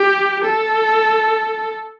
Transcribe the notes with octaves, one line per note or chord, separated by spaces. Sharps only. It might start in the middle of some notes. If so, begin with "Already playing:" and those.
Already playing: G4
A4